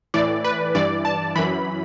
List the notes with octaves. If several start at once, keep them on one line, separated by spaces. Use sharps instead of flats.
A2 E3 D5
B4
G2 E3 D5
A5
F#2 E3 B5